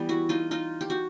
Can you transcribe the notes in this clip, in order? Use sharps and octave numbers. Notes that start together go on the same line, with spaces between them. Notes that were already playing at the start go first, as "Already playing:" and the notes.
Already playing: E3 G3 B3
E4 F#4
D#4 F4
D#4 F4
G4
F#4